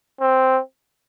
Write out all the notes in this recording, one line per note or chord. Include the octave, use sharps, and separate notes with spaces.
C4